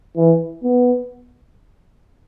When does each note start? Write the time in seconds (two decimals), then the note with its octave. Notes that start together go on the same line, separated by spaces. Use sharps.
0.17 E3
0.63 B3